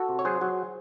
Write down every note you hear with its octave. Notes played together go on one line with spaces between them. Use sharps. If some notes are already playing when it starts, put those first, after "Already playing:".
Already playing: F#4 A4
C3
C#5
F#3 G#4 C5
F#3